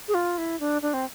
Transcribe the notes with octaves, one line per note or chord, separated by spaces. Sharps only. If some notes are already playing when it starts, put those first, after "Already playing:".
G#4
F4
E4
D4
D4
C4